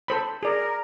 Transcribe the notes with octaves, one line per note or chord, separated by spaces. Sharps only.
A4 C5 B5
G#4 A#4 D5